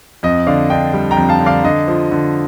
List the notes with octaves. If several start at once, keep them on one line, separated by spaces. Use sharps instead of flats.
F2 D#5
D3 D5 F5
D4 D#5 G5
G3
G5 A#5
F2
F5 A5
D3
D5 F5
D3 D#5
F3
D3